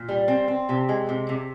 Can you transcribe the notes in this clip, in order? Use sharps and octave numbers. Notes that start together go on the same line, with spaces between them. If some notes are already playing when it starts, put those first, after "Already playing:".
Already playing: A#2
G3
C4
C4
C3
G#3
C3
C3